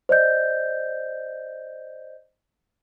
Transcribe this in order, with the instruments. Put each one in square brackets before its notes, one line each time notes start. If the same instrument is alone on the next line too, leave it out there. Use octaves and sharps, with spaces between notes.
[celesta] C5 D5 D#5 G6